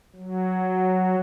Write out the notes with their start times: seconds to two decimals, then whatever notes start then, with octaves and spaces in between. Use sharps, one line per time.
0.16 F#3